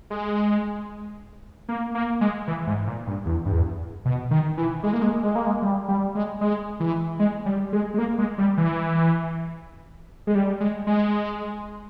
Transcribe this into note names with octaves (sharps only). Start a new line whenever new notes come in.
G#3
A#3
A#3
G#3
E3
G#2
A#2
G2
E2
G2
E2
B2
D#3
E3
G#3
A#3
G#3
G#3
A#3
G#3
G3
G3
G#3
G#3
E3
G#3
G3
G#3
G#3
A#3
G#3
G3
E3
G#3
G3
G#3
G#3